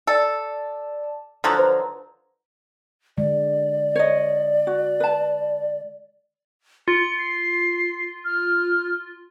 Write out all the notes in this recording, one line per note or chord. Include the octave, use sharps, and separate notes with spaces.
A4 D5 A5
D3 F3 F#3
B4 C5 A#5
D3 G#3 D5
C#5 D#5
F#4
B4 A5
F4 C#7
C7
F6